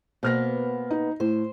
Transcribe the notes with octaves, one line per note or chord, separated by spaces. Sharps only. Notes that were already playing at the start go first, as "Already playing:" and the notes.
B2 A#3 B3 C5 F6 A#6
D#4
A2 C5